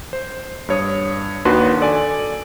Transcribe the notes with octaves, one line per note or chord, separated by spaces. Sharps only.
C5
G2 C#5 D#6
D#2 D#3 D4 F#4 B4 C6
A4 D5 G#5